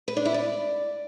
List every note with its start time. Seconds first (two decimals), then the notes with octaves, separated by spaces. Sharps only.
0.08 B4
0.17 D4
0.25 E4
0.34 D5